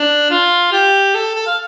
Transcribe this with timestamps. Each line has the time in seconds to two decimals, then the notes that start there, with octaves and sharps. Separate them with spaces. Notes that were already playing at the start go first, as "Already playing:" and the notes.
Already playing: D4
0.30 F4
0.72 G4
1.15 A4
1.35 A4
1.47 F5